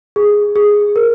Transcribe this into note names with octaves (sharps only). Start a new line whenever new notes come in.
G#4
G#4
A#4